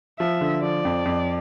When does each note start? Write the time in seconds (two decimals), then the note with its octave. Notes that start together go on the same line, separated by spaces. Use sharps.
0.19 F3 E5
0.41 D3
0.62 F3 D5
0.85 F2
1.05 F2